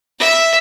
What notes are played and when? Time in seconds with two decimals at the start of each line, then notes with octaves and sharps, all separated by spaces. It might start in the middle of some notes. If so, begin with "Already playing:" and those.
0.19 E5